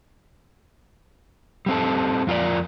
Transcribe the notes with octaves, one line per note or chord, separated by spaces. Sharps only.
G3 C4 A4
F2 F4 A#4 D5